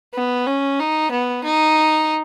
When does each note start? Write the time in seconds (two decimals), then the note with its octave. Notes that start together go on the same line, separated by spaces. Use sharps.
0.15 B3
0.47 C#4
0.79 D#4
1.12 B3
1.44 D#4